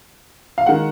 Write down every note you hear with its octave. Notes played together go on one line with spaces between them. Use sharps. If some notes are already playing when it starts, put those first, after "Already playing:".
F5
D#3 G#3 F#5